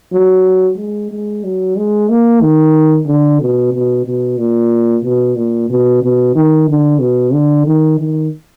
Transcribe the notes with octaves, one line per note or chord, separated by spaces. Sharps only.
F#3
G#3
G#3
F#3
G#3
A#3
D#3
D3
B2
B2
B2
A#2
B2
A#2
B2
B2
D#3
D3
B2
D3
D#3
D#3